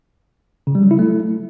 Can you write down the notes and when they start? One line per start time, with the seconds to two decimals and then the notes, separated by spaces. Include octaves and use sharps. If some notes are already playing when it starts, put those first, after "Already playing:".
0.67 C#3
0.75 G3
0.83 F#3
0.91 E4
0.99 A3